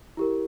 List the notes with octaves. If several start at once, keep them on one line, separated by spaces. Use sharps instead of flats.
E4 G4 A#4